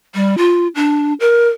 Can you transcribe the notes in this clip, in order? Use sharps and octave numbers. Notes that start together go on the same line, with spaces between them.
G3
F4
D4
A#4